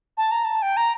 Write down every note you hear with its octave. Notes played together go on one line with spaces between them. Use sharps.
A5
A#5
A5
G5
A#5